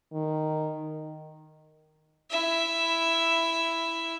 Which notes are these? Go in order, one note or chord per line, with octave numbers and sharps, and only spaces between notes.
D#3
E4 E5